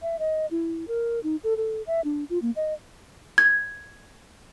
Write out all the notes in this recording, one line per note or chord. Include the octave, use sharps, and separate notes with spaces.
E5
D#5
E4
A#4
D#4
A4
A4
E5
D4
F4
A#3
D#5
G#6